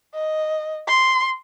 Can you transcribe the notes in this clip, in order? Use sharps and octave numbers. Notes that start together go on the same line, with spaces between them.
D#5
C6